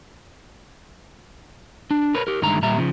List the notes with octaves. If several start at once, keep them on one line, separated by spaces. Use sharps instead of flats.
D4
A#4 B4 C#5
G4 A#4
G2 D3 D#3 G#3 A3 A#5
A#2 G3 G4 E5 A#5
C#3 F3